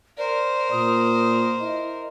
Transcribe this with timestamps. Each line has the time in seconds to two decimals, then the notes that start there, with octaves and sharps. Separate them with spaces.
0.18 A#4 C5 D5
0.71 A#2 D#6
1.60 E4 D#5